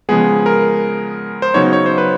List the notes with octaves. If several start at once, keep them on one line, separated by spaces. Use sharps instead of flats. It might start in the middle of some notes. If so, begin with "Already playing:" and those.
C#3 F3 G#3 B3 G#4
A#4
C5
C#3 F#3 B3 D#4 C#5
C#5
C5
B4